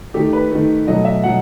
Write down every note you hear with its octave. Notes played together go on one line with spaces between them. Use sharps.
D#3 A3 G4
B4
D#3 A3
B2 F#3 A3 D#5
E5
B2 F#3 F#5